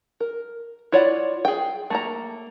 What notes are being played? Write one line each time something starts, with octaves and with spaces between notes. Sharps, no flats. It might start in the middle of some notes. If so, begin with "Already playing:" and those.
A#4
E4 F4 C#5 D5 F#5
G#4 G5
A3 A#3 A#5